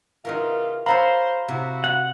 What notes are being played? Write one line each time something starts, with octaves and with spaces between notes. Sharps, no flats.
C#3 E3 D#4 F4 F#4 A#4
F#4 A4 C5 C#5 F5 A#5 B5
C3 E4 F#4
F4 F#5